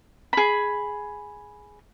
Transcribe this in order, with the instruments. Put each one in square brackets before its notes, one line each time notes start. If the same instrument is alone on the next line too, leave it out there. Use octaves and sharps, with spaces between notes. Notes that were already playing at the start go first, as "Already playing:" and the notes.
[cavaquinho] G#4 B5